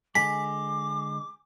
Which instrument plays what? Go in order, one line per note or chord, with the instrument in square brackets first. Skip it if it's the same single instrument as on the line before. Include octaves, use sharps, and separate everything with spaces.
[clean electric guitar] D3 G#3 [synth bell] G#5 [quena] D6 [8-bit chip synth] B6